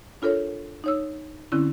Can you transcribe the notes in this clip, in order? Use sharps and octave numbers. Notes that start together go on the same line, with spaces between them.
D4 F4 A4 A#4 C#5
D#4 C#5 E6
D3 C4 C#4 E4